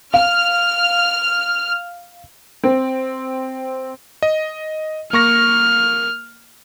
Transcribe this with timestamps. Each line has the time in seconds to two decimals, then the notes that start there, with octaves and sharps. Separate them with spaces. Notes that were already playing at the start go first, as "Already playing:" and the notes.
0.14 F5 F6
2.64 C4
4.22 D#5
5.13 A#3 C#6 F6 A#6